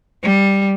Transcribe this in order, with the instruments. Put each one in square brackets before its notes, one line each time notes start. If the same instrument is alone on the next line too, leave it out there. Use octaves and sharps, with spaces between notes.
[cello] G3